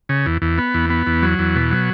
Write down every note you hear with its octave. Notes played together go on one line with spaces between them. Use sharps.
C#3
E2
E2
B3
E2
B3
E2
F#3
E2
B2
F#3